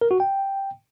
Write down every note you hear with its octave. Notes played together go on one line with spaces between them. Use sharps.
A#4
F#4
G5